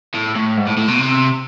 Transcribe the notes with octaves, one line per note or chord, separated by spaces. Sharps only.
A2
A2
G#2
A2
A2
B2
C3